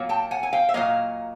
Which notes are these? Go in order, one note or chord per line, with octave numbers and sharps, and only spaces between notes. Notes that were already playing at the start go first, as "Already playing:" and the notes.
Already playing: A#2 F#3 A#3
G5 A5
F#5 G#5
G#5
F5 G5
E5
A#2 F#3 A#3 D#5 F5